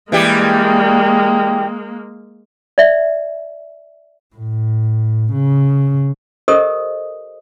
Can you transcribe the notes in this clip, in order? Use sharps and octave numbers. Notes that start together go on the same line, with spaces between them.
E3 G3 G#3 A#3 G4
D5 E5
A2
C#3
G4 A4 A#4 C5 D#5 D#6